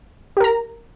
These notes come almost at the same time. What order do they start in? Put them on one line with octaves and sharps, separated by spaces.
G4 A#4 A#5